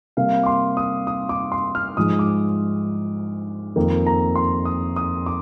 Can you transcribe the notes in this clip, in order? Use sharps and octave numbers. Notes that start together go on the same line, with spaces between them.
C3 G3 A#3 F5
D6
C6
D#6
D#6
D6
C6
F6
G#2 F3 G#3 D#6
D6
F2 D#3 A#3
A#5
C6
D#6
D#6
D6